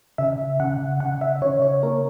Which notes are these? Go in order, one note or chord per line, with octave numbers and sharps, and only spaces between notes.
C#3 E5
C#3 F#5
C#3 F#5
E5
C#3 C#5
C#5
A#3 A#4